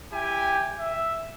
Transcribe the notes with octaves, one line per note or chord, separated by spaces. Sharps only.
E4 G4 G5 G#5
E5